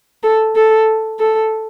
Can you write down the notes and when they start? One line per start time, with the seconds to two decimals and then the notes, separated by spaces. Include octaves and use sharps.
0.23 A4
0.56 A4
1.19 A4